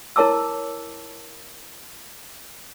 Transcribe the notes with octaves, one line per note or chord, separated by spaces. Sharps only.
E4 A#4 C#5 A5 D6 E6